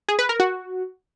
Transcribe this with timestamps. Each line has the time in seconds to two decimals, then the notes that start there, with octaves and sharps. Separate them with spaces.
0.09 G#4
0.19 B4
0.29 A#4
0.40 F#4